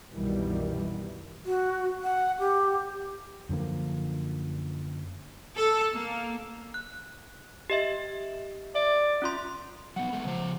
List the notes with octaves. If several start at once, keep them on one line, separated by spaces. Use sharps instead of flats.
C2 F#2 B2 D#3 E3 G3
F#4
F#5
G4
F#2 D3 F3 A#3
A4
A#3
F#6
G4 D#5 E5
D5 E5
C#4 F4 C6
F#3 B3 F#5
G#3 A3 B3
C#3 F3 C5